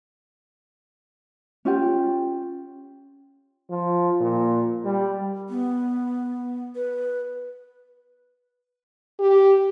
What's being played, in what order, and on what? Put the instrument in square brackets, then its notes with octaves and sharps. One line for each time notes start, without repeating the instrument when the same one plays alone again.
[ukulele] C#4 F4 G4 G5
[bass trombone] F3
A#2
G3
[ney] B3
B4
[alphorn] G4